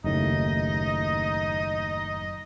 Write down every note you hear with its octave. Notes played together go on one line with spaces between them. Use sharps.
F#1 D#2 A2 D#4 D#5